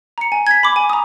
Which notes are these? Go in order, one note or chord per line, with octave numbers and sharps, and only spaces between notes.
A#5 C#7
G#5
G#6 B6
B5 D6
G#5
A#5 D#6